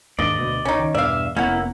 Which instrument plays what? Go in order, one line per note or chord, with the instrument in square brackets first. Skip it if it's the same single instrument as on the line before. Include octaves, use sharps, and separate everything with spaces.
[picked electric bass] D#2 G#2 A#3 [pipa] D4 [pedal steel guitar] D5 D#5
[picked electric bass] D2 B2
[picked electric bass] C#2 [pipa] C#4 D#4
[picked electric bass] D#3
[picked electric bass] E2 G2 B2 [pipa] D5 F5 [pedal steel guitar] E5
[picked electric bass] F1 B3 [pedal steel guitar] A#3 E4 [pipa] C#4 F#5